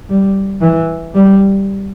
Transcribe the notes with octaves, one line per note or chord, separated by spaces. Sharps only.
G3
E3
G3